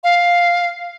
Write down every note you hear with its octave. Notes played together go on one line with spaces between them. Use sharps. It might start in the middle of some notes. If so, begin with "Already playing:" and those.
F5